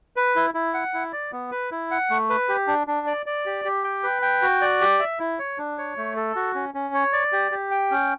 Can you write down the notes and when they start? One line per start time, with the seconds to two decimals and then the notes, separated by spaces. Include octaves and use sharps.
0.16 B4
0.36 E4
0.54 E4
0.74 F#5
0.94 E4
1.13 D5
1.32 B3
1.51 B4
1.71 E4
1.91 F#5
2.10 A3
2.30 B4
2.49 G4
2.67 D4
2.87 D4
3.07 D5
3.26 D5
3.46 G4
3.65 G4
3.84 G5
4.03 B4
4.22 G5
4.42 F#4
4.62 D5
4.81 G4
5.00 E5
5.20 E4
5.39 C#5
5.58 D4
5.78 C#5
5.97 A3
6.16 A4
6.36 F#4
6.55 C#4
6.74 C#4
6.94 C#5
7.13 D5
7.32 G4
7.52 G4
7.71 G5
7.91 C#4